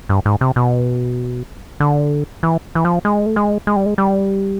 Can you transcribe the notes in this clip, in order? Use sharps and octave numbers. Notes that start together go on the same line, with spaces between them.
G2
G#2
C3
B2
D3
E3
E3
F3
G#3
A3
G#3
G#3
G3
G#3
G3